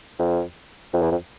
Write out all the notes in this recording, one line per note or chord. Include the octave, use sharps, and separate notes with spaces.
F2
F2
E2
F2